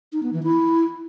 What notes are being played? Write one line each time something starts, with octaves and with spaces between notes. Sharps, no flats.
D#4
B3
E3
E4